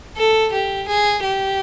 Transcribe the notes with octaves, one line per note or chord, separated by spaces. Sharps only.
A4
G4
G#4
G4